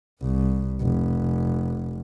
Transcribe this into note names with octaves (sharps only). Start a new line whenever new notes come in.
C2
F1